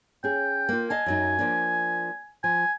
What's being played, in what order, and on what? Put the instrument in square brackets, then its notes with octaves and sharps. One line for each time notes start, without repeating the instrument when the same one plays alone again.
[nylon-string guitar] C#4 G#4 [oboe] G5
[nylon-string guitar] A#3 F4
[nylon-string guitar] D#5 F5 A5 [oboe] G#5
[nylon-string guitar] F#2 F#3 D#4
F3 A#3 D4
[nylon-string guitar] F3 [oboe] G#5